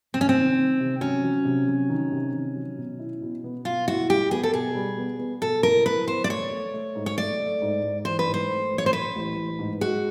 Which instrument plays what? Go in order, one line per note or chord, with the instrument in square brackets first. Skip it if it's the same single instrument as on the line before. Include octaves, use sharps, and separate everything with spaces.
[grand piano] C3 [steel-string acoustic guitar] C4
[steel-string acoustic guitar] C#4
C4
[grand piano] D#3
D#3
C3
[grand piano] F#3 [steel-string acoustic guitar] C#4
[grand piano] F#3
C3
F#3
D#3
C3
D#3
F#3
B2
E4
B2
B3
[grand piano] B2 [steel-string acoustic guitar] F4
[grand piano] E4 [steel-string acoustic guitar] F#4
[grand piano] G3 [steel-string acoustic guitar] G4
[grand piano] B3 [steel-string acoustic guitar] G#4
[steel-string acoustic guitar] A4
[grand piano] B2 [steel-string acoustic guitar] G#4
[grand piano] G3
B3
B3
[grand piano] B2 [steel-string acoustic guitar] A4
[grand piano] E4 [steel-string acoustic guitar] A#4
[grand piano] E4 [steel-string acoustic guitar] B4
[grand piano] B3 [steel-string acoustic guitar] C5
[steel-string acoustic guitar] D5
[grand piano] A3 [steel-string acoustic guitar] C#5
[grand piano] A3
A3
G#2
[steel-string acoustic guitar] C#5
[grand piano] A3 [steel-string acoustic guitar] D5
[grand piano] A3
G#2
G#2
[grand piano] E3 [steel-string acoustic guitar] C5
[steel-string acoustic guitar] B4
[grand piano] G#2
[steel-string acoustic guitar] C5
[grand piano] A3
A1
[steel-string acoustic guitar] C#5
C5
[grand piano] A3 [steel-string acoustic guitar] B4
[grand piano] A1
A1
G#2
[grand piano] G#3 [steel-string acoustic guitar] F#4